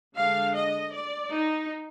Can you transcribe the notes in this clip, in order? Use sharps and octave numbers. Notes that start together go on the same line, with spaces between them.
D3 G#3 D4 F5
D#5
D5
D#4